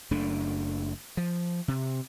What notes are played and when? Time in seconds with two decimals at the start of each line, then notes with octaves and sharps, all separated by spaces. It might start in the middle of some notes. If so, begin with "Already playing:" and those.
0.11 F#1 F#2 A3 D4
1.17 F3
1.68 C3